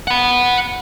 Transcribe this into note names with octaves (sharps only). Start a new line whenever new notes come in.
F#5 B5